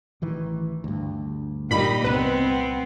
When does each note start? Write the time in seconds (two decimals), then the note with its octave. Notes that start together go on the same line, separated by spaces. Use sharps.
0.22 A1 D#3 E3
0.84 D2 G2
1.71 G1 A#2 G3 D#4 D#5 B5
2.04 C2 B3 C4 B4